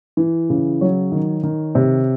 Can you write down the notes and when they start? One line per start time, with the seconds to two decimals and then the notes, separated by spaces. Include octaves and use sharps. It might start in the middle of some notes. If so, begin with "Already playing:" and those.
0.17 E3
0.50 C#3
0.81 F#3 C#5
1.12 D#3
1.43 D#3
1.75 C3